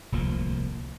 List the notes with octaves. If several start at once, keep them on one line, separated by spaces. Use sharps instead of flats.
D1 C2 F3 A#3